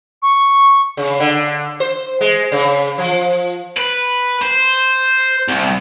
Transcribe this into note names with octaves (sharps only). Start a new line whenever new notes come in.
C#6
C#3
D3
C5
G#3
C#3
F3
B4
C5
C2